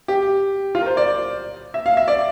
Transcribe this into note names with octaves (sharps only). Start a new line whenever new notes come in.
G4
F4
A#4
C5
D5
E5
F5
E5
D5